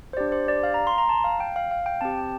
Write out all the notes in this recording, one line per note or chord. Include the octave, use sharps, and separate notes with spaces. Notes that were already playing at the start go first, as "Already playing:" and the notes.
C5
D4 G4 D5
C5
D5
F5
A#5
C6
A#5
A5
F5
G5
F5
F5
G5
C4 G4 A5
G5